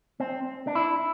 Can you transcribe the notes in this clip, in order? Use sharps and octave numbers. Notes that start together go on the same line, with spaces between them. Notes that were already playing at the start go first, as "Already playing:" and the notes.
C4
D4
E4